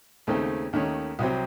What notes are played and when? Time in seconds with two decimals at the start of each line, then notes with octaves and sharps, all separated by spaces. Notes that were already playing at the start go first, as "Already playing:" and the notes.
0.27 D#2 C#3 A3 C4 D#4
0.73 D#2 D#3 A3 C#4
1.19 C2 C3 F#3 C4